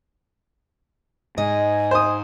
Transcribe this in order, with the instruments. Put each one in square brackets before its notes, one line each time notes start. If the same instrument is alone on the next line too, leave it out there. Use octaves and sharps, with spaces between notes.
[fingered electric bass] G#2 [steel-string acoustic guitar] D#5 [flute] G#5
[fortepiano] C5 D#6